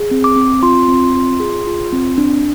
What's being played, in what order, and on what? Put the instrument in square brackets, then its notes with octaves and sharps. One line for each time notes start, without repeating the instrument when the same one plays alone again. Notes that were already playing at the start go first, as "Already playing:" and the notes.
Already playing: [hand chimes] G#4
C4
D6
C4
F4 C6
C4
F4
G#4
F4
C4
D4